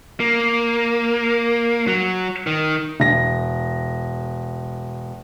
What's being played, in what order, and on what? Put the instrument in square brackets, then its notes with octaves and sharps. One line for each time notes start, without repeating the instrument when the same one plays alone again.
[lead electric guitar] A#3
F#3
D#3
[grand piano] E1 A#6